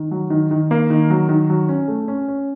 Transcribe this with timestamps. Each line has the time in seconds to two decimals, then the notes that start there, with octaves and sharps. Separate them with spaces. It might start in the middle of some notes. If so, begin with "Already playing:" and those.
Already playing: D#3
0.11 F#3
0.30 D#3
0.51 D#3
0.71 A#3
0.90 D#3
1.10 F#3
1.29 D#3
1.50 F#3
1.69 C#4
1.88 A3
2.08 C#4
2.28 C#4